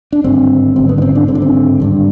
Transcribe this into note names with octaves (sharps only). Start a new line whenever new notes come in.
D4
G#1 G2 D3 C4
G#1 G2 D3 C4
B3
D4
C4
D4
G#1 G2 D3 C4
D4
C4
G#1 G2 D3